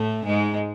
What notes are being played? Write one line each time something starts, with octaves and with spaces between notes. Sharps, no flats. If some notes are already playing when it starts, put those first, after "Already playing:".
Already playing: A2 A3
G#2 G#3